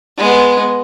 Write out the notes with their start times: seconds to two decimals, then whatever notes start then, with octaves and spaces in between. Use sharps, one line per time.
0.18 G#3 B3